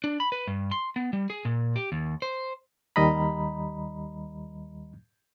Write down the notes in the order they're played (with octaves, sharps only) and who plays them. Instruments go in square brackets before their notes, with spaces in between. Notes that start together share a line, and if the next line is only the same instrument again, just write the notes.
[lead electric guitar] D4
B5
B4
G2
C6
B3
G3
G#4
A#2
G4
D#2
C5
[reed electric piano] D#2 D#3 G3 D#5 A#5 B5